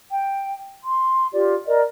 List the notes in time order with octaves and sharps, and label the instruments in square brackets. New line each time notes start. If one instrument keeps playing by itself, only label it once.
[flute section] G5
C6
F4 G4 D5
A#4 D5 D#5